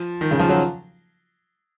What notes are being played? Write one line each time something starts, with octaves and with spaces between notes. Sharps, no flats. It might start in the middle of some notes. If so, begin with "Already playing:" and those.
Already playing: F3
D#3
C#3
F3
F#3